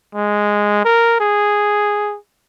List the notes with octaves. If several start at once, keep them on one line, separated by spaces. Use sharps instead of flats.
G#3
A#4
G#4